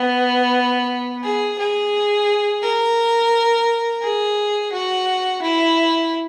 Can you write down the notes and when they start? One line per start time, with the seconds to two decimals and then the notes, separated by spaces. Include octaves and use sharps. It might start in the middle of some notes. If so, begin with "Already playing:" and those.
Already playing: B3
1.24 G#4
1.59 G#4
2.62 A#4
4.03 G#4
4.73 F#4
5.42 E4